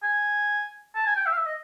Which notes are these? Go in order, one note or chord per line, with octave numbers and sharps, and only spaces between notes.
G#5
A5
G#5
G5
E5
F5
E5
D#5